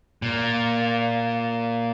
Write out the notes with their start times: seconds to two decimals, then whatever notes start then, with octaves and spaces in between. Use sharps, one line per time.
0.22 A#2